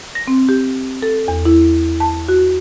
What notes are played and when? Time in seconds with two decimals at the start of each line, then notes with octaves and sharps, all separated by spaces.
0.15 A#6
0.28 C4
0.49 G4
1.03 A4
1.28 E2
1.45 E4
2.00 A5
2.29 F#4